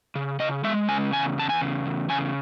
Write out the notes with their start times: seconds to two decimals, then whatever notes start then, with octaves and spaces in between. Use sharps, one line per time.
0.15 C#3
0.39 C#3 D#5
0.64 G#3 E5
0.88 C#3 G#5
1.13 E2 G#5
1.38 E2 A5
1.49 G#5
1.61 C#3
1.86 E2
2.10 C#3 G#5